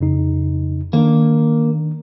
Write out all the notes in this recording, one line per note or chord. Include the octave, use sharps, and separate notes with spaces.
F2 C#3 D#4
D#3 A#3 D4